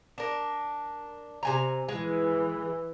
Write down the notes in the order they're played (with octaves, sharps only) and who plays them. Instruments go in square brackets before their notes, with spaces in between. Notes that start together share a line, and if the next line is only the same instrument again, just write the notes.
[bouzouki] D4 A#4
C3 G#5 A#5
[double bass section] E3 [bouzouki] G#3